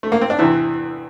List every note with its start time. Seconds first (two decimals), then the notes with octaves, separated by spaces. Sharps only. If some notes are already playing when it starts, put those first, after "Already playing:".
0.03 A3
0.12 A#3
0.21 C4
0.30 D4
0.39 E2 C3 E3 E4